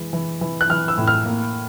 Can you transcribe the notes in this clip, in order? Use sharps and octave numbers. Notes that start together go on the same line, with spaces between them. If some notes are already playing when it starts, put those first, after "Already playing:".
Already playing: E3 G#3
E3
E3
F#6
E3 F6
E6
A2
F6
A#3